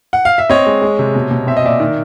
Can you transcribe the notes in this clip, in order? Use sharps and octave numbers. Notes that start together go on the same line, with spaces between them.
F#5
F5
E5
C4 C#5 D#5
G#3
G#3
C3
B2
B2
C4 E5
D#5
A#2 D5 E5
D#3